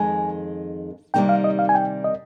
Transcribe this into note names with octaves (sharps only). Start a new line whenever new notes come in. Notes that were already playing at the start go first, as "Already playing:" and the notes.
Already playing: F2 D#3 G#3 G#5
C3 D#3 G3 A#3 D#4 G5
F5
D#5
F5
G#5
G5
D#5